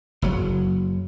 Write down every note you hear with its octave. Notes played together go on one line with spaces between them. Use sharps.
F#1 F#3